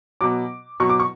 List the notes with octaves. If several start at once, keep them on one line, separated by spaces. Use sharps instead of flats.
B2 F#3 D6
B2 F#3 C#6
D6
C#6